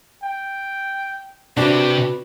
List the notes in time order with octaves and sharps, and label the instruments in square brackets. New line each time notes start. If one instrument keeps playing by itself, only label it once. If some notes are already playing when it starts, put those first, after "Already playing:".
[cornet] G5
[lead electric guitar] C3 G4 [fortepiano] D4 [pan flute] F#4 [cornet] B4